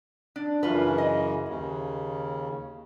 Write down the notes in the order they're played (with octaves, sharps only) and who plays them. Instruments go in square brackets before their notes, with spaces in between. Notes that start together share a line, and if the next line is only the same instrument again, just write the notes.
[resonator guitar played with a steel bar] D4
[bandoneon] F#2 C#3 E3 [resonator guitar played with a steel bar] F4 B4
[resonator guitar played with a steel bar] D#5
[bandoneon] D#2 C#3